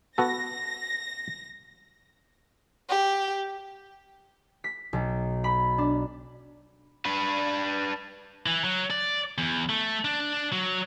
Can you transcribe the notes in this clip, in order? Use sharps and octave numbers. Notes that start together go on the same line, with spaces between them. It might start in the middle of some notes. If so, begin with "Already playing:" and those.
B3 F#4 A4 A#6
G4
B6
B1
B5
D4
D4 B4
E3
F#3
D5
E2
A3
D4
F#3